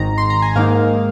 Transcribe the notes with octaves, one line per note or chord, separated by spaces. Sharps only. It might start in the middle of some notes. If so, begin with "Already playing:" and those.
Already playing: G#1 G#2 D#3 A#5
C6
A#5
G#5
G#2 D#3 A#3 D#4 F5